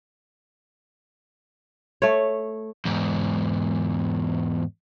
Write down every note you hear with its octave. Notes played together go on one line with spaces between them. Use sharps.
A3 C#5
E2 G#2